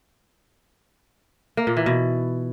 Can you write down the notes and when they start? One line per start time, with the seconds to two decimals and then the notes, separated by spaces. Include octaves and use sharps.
1.57 A#3
1.67 A#2
1.77 E3
1.86 B2